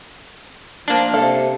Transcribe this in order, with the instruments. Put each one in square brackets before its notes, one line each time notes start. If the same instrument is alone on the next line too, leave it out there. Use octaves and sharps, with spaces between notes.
[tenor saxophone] F3 [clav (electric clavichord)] A#3 D4
[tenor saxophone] C3 [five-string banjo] A4 F5